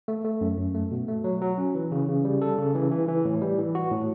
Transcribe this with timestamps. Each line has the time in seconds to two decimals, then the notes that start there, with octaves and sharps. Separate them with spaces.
0.08 A3
0.25 A3
0.41 F#2
0.58 F#2
0.75 A3
0.91 B2
1.08 A3
1.24 F#3
1.41 F#3
1.58 C#4
1.75 E3
1.92 C#3
2.08 C#3
2.25 G3
2.42 A4
2.58 C#3
2.75 E3
2.91 E3
3.08 E3
3.25 A2
3.42 G3
3.59 E3
3.75 F#4
3.92 A2